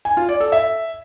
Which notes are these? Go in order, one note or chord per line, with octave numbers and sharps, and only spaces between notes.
G#5
F4
D5
A4
E5